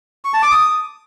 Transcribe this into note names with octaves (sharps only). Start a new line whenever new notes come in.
C#6
A5
D6
D#6